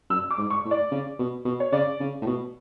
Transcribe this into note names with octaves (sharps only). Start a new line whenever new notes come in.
F#2 E6
D6
G#2
C#6
A2
D5
C#3
B2
B2
C#5
C#3 D5
C#3
A2
B2